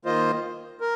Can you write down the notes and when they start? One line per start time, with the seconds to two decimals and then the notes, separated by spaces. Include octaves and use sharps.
0.05 D#3 A#3 F4 C5 D#5
0.81 A#4